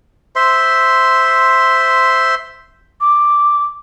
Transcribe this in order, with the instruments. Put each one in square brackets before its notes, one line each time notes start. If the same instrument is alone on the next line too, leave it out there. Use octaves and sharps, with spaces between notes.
[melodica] C5 E5 C6
[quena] D6